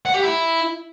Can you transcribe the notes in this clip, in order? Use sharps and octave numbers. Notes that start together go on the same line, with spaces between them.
F#5
G4
E4